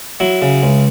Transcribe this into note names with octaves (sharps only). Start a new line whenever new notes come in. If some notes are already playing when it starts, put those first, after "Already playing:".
F#3 E4
C#3
C#2